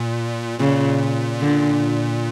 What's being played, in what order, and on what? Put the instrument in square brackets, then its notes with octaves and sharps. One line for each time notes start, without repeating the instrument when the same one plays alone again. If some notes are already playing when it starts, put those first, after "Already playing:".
Already playing: [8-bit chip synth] A#2
[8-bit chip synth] A#2 [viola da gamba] C#3
[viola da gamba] D3